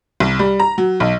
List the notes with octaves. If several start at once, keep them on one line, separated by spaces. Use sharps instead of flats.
C2
G3
A#5
F#3
B1